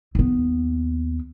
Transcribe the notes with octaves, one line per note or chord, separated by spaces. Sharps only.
D#2 B3